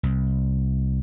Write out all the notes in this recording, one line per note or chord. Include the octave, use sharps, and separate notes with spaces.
C2